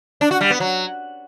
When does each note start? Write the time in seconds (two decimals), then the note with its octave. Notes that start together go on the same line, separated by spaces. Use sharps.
0.21 D4
0.31 F#4
0.41 G3
0.50 B3
0.60 F#3